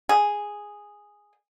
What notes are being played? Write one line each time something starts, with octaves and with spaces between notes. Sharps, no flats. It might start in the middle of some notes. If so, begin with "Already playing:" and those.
G#4